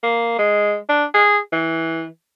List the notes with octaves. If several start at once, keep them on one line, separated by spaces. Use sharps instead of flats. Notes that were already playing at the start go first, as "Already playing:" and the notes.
A#3
G#3
D4
G#4
E3